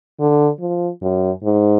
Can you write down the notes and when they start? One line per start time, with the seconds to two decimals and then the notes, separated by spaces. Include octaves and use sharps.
0.20 D3
0.60 F3
1.02 F#2
1.44 G#2